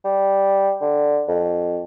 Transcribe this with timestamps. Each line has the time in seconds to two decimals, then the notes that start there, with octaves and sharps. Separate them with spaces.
0.04 G3
0.81 D3
1.28 F2